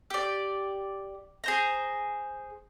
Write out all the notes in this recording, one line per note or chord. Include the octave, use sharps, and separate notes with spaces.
G4 D5
G#4 C5 A#5